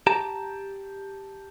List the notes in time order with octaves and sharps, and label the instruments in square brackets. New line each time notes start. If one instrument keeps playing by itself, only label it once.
[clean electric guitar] G4 A5 A#5